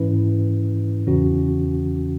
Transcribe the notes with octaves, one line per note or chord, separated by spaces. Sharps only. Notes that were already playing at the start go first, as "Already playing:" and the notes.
Already playing: G#2 E3 C#4 E4 B4
E2 C#3 E3 C#4 F#4